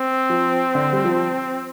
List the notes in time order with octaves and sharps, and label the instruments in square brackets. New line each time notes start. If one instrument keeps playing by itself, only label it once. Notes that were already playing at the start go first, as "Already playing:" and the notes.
Already playing: [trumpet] C4
[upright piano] F3
D3
G3
F3